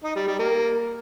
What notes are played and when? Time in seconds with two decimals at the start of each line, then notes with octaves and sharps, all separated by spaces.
0.04 D#4
0.16 G3
0.27 G3
0.39 A#3